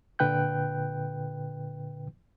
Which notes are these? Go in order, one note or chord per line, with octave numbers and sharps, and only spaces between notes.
A#2 D3 B4 G5 F#6 G6